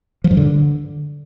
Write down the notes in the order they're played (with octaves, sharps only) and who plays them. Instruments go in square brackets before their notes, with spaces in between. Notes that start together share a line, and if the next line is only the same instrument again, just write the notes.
[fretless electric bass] F3
G2
D3